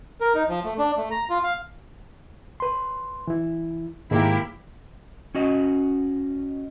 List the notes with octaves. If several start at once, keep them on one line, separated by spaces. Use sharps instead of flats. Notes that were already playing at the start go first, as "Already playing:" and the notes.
A#4
D#4
F3
A3
D4
A3
A#5
F4
F5
B4 C6
E3 E4
G#2 D#3 G#3 A#3 E4 G4
C#4 F#4 D#5